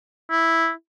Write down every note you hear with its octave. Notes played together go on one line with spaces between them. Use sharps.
E4